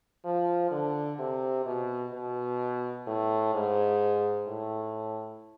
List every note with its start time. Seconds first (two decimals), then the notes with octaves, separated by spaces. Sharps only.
0.25 F3
0.71 D3
1.19 C3
1.66 B2
2.13 B2
3.07 A2
3.54 G#2
4.47 A2